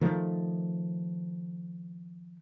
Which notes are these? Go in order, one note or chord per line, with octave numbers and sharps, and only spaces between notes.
D#3 F3 A3